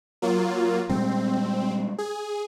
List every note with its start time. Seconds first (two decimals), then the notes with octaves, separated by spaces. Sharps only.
0.22 F#3 A#3 F4
0.89 A#2 G3 G#3 C4
1.98 G#4